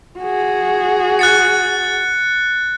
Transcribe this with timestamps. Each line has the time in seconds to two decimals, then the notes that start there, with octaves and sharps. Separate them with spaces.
0.19 F#4 G#4
1.19 F#6 A6 C#7